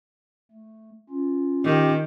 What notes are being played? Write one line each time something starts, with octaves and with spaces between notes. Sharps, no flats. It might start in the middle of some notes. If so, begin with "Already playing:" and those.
A3
C#4 F4
D#3 G4